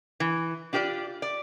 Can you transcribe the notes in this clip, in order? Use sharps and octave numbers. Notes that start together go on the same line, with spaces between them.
E3
D4 F4 G4 C#5 D5
D5